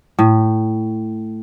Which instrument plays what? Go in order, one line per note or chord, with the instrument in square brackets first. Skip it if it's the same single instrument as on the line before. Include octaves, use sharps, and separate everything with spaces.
[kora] A2